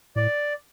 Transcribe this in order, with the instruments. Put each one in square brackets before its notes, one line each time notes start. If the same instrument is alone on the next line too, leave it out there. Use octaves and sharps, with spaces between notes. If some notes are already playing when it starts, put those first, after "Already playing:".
[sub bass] A2 [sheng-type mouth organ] D5